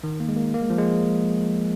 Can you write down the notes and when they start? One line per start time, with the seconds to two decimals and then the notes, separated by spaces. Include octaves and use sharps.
0.04 D#3
0.20 A#3
0.29 G#3
0.36 A#3
0.54 A#3
0.61 G#3
0.70 F3
0.78 G#3